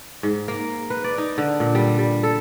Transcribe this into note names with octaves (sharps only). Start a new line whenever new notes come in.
G#2
A#3
B4
D5
D#4
D3
A#2
G3
G3
A4